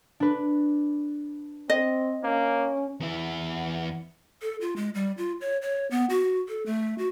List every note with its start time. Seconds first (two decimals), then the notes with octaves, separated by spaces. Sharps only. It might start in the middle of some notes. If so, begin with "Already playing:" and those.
0.20 D4 B4
1.70 C4 D#5
2.24 A#3 C#4
3.00 E2 E4
4.42 A4
4.61 F4
4.76 G#3
4.95 G3
5.17 F4
5.41 C#5
5.62 C#5
5.91 B3
6.10 F#4
6.48 A4
6.66 A3
6.98 F#4